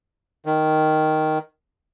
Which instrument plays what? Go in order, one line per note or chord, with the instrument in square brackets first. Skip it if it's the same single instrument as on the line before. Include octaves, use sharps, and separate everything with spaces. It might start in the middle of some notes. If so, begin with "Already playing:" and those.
[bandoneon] D#3